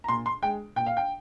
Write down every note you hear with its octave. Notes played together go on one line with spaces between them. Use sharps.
A#5
A#2 C6
C6
G#3 G5
A#2 G5
F5
G5